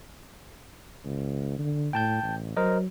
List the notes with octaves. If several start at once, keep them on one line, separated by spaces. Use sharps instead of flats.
C#2
D3
A2 G5 A5 G6
A1
F#3 A#4 C5 D#5